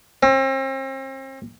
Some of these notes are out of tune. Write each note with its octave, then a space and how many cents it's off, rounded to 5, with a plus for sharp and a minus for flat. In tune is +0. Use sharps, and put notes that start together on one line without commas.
C4 +40